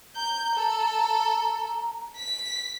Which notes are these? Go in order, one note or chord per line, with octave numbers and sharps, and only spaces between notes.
A#5 G6
A4
B6